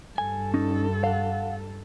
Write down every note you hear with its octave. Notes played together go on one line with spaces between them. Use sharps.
G2 A4 G#5
C#4 D#4
F5 F#5